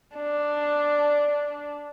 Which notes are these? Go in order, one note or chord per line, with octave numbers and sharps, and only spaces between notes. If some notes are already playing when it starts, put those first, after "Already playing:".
D4